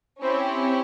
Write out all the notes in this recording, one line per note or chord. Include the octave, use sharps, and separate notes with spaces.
C4 C#4 E4 G4 C#5